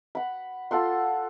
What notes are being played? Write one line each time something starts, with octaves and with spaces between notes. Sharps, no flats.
F#5 B5
F4 A4 F#5 C6